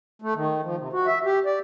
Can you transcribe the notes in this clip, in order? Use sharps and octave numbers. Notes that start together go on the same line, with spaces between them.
A3
D#3
F3
C3
F#4
E5
G4
D5